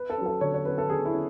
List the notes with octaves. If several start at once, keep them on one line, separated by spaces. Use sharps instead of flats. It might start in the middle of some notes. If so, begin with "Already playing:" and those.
Already playing: B4
A4
F#3 C#4
A4
D3 C#5
C#5
F#3 C#4 B4
A4
D3 G#4
E4
C#4